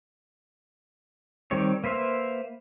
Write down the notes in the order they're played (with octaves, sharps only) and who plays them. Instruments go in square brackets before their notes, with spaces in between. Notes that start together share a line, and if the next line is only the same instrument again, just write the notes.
[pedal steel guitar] D#3 G3 C4 C#5
A#3 B4 C5 E5 F5